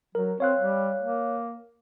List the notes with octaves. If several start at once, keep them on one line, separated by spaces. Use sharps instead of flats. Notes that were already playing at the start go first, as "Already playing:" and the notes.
F#3 A#4
C4 C#5 F5 F#6
G3
A#3